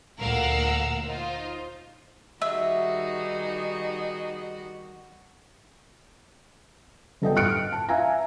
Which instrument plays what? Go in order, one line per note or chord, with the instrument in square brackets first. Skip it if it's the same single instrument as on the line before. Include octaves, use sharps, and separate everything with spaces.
[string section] D2 A#2 A#4 F5 F#5 E6
D#4 F4 C5
[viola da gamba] D#3 G3 F#4 [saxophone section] D#4 G#4 D#5 [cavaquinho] E5
[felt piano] G1 A4 D#5 G5
F6 F#6 C#7 D7
A5
E5 F5 G#5 A#5